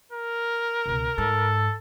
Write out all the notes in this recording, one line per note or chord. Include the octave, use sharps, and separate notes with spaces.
A#4
C#2 B2
G#2 A4